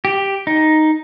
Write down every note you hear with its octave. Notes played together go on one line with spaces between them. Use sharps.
G4
D#4